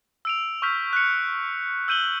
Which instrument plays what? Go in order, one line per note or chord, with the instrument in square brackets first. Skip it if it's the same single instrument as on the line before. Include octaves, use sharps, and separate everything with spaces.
[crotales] E6 D7 F7
C#6 E6 F6 G6 B6 F7
F#6 C#7
E6 G6 D#7 F#7 G7